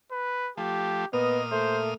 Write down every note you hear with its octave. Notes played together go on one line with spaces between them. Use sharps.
B4
F3 A3 G4
A#2 B3 D#5 D#6 F6
A3 C5